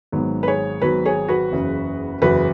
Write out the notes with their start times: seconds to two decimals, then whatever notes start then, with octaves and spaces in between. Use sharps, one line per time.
0.12 G#1 G#2 F#3 B3
0.43 B4
0.47 G#4 C#5
0.82 G#1 G#2 F#3 B3 F#4 B4
1.06 G#4 C#5
1.28 F#4 B4
1.52 F#1 E2 C#3
2.22 F#1 E2 C#3 F#4 B4